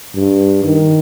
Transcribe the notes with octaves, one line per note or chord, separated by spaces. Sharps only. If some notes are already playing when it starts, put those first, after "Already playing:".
G2
D#3